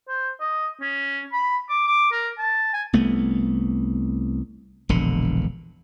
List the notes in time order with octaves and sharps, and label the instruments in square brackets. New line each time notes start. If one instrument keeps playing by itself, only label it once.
[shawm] C5
D#5
C#4
B5
D6
D6
A#4
A5
G#5
[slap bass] C2 A3 B3
E1 A#1 D3